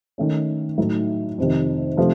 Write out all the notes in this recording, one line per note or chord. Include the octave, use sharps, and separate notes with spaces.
D#3 A3 C#4
A2 F#3 A3 D#4
F2 C3 D#3
C3 F3 A3